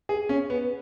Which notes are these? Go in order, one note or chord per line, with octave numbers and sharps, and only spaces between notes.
G#4
C#4
B3